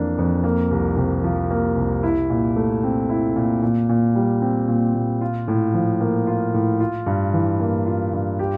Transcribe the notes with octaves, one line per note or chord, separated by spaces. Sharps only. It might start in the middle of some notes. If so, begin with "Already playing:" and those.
Already playing: F2 E3 A#3 D4
F2
A#3
C2
C3
F3
A#3
C2
E4
A#2
A3
C4
E4
A#2
A#2
A#2
G3
C4
A#2
A#2
F4
A2
F3
A#3
F4
A2
F4
G2
E3
A#3
F4
G2
G4